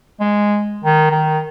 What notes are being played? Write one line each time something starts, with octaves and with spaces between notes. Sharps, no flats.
G#3
D#3
D#3